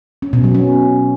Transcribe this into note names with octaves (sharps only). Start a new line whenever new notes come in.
C#4
B2
F#3
C#4